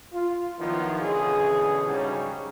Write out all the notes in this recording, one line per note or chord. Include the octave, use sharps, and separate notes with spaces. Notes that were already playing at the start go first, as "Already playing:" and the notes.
F4
D#3 F3 F#3 B3 E4 F4
B2 D3 E3 C#4 G#4
G#2 C#3 F#3 G3 C#4